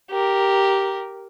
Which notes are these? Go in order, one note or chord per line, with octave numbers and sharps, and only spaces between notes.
G4 A#4